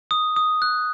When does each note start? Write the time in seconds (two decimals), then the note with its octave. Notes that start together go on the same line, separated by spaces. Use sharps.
0.11 D#6
0.36 D#6
0.62 F#6